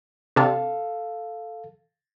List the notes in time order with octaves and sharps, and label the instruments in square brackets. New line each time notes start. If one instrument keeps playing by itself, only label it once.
[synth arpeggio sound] C3 D4 [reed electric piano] A4 F5